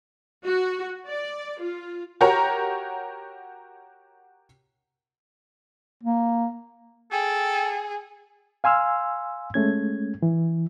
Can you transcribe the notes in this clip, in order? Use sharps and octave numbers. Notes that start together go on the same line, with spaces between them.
F#4
D5
F4
F#4 G4 A#4 C#5 A#5
A#3
G#4 A4 G5
F5 G#5 C6 E6 F6
G#3 A3 C#4 G#6
E3